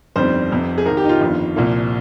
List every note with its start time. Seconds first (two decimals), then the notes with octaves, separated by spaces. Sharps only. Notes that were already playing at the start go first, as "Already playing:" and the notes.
0.16 G1 F2 D#3 G3 C4 C5
0.51 F1 F2 C3
0.78 G#4
0.86 G#1 G#2 D#3 A#4
0.97 G4
1.05 D#4
1.09 F4
1.21 G1 F2 D#3
1.56 C2 A#2 F3 A#3